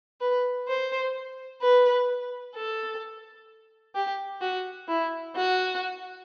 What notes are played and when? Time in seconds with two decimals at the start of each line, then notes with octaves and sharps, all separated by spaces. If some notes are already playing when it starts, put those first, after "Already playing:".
0.21 B4
0.68 C5
1.62 B4
2.55 A4
3.95 G4
4.41 F#4
4.88 E4
5.36 F#4